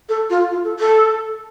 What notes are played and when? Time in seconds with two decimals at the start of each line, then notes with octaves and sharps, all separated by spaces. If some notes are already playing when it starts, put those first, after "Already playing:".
0.09 A4
0.30 F4
0.51 F4
0.65 A4
0.79 A4